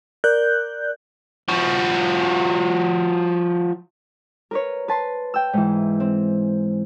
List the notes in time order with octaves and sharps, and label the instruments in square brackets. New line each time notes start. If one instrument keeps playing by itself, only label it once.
[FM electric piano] A#4 D5 F#6 G6
[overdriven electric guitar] F3 F#4
[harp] A#4 B4 C#5
B4 A5 C6
G5 E6
G#2 E3
C4